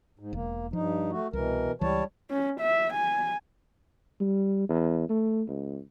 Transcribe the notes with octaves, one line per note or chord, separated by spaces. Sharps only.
G#2
E1 A#3
G2 F3 D#4
A3 F#4
C2 B2 E3 A#4
C#2 E3 G3 C#5 A5
C#4
E5
G#5
G3
E2
A3
C#2